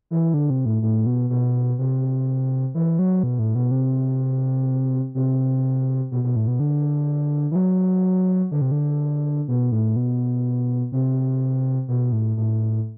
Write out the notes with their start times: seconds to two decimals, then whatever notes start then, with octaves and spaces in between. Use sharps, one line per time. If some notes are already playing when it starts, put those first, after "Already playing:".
0.11 E3
0.34 D3
0.50 C3
0.66 A2
0.82 A2
1.06 B2
1.30 B2
1.79 C3
2.75 E3
2.99 F#3
3.23 B2
3.39 A2
3.55 B2
3.71 C3
5.15 C3
6.12 B2
6.24 B2
6.36 A2
6.47 B2
6.60 D3
7.52 E3
7.55 F#3
8.51 D3
8.62 C3
8.72 D3
9.48 B2
9.72 A2
9.96 B2
10.92 C3
11.88 B2
12.12 A2
12.37 A2